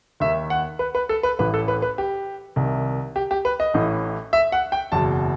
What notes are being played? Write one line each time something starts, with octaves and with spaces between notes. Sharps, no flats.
D#2 D#3 E5
F#5
B4
B4
A4
B4
A1 A2 E3 B4
A4
B4
B4
G4
C2 C3 D#3
G4
G4
B4
D#5
A1 A2 E3
E5
F#5
G5
F#1 E2 B2 A5